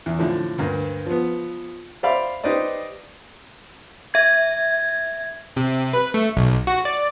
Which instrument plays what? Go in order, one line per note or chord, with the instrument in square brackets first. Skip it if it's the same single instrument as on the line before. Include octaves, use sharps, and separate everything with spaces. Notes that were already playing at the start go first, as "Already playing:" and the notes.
[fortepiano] E2
A2 D3 F3
D2 G2 A#3
F3 B3
C5 D5 E5 F5 B5
D#4 G4 B4 C5 D5 D#5
[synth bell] E5 G#6
[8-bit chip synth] C3
B4
A3
B1
F#4
D5